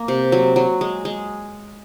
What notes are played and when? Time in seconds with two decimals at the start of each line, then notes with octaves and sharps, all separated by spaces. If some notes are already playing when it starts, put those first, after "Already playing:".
Already playing: A#3
0.08 C3
0.32 F#3
0.56 F#3
0.81 G#3
1.05 G#3